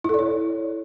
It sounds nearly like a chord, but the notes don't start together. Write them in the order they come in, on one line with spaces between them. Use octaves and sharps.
E4 A4 D5 C#5